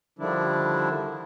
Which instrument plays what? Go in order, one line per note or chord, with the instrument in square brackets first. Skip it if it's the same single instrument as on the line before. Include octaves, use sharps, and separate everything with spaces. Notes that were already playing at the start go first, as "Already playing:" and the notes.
[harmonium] D3 D#3 F3 G3 D4 E4